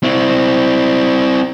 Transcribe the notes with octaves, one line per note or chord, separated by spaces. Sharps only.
C4 E4